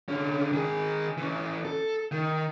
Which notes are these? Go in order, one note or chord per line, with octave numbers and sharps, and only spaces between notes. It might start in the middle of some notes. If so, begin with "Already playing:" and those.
D3 C#4
D#3 G#4
E3 C#4
A4
D#3